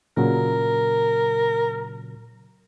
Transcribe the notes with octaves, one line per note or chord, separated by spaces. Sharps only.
A#2 C#3 F#3 A#4